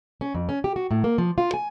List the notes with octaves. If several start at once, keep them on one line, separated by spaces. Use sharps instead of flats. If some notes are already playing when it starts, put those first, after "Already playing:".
C#4
F2
C#4
G4
F#4
A2
A#3
F3
F4
G#5